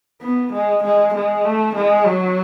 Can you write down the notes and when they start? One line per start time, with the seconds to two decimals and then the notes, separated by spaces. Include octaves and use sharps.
0.21 B3
0.53 G#3
0.84 G#3
1.15 G#3
1.45 A3
1.76 G#3
2.07 F#3